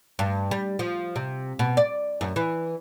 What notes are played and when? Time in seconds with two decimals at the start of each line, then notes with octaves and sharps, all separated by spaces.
0.19 G2
0.51 G3
0.79 F3
1.16 C3
1.59 B2
1.77 D5
2.21 F#2
2.36 E3